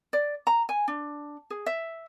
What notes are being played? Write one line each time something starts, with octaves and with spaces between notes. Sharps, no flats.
D5
A#5
G#5
D4
G#4
E5